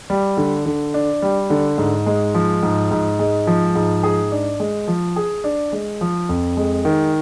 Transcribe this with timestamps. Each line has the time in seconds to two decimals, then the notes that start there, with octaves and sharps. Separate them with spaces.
0.10 G3
0.37 D3
0.66 D3
0.94 D4
1.22 G3
1.50 D3
1.78 G#2
2.06 G#3
2.34 F3
2.63 G#2
2.91 G#2
3.19 G#3
3.47 F3
3.75 G#2
4.03 G#4
4.31 D4
4.60 G#3
4.88 F3
5.16 G#4
5.44 D4
5.72 G#3
6.01 F3
6.29 F2
6.57 G#3
6.85 D#3